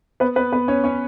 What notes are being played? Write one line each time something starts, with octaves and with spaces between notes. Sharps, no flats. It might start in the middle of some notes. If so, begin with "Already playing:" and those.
B3 B4
B3 B4
B3 B4
C#4 C#5
C#4 C#5